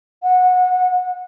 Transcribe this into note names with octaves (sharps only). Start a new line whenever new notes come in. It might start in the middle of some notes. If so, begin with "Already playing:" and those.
F#5